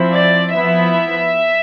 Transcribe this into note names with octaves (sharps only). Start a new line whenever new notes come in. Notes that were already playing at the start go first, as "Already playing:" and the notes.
Already playing: F3 C4 E4
D5
F3 B3 E4 E5